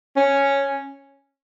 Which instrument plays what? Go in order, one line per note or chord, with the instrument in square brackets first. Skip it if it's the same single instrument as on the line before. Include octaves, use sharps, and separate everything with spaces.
[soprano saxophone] C#4